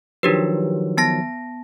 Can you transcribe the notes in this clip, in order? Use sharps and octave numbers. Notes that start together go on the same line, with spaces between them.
D#3 F3 F#3 D4 G4 B4
B3 A5 A#6